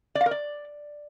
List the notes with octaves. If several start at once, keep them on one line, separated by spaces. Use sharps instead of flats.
D5
F5
A#4
D5